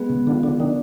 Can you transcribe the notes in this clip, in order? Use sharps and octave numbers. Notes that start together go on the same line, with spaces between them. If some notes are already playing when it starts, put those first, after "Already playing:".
Already playing: G#3 B3
C#3
D3 F4
D3
D#3 D4